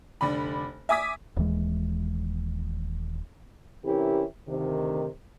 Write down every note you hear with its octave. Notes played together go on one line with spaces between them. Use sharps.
F1 D3 D5 B5
E5 G#5 D6 D#6 B6
D#1 D#2 E3 G#3
C3 E3 C#4 E4 G4 A#4
D2 C3 D#3